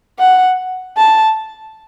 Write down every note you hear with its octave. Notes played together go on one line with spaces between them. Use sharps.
F#5
A5